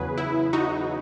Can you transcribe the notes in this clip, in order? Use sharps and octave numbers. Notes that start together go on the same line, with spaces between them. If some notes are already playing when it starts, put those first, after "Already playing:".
Already playing: E2 C#3 F#3 G#4 B4
E4
D#4 F#4